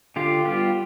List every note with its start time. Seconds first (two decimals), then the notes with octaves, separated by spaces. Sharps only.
0.16 D3 F4 G4
0.45 G3 B3 F4 G4